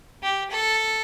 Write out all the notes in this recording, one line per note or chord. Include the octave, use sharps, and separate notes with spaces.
G4
A4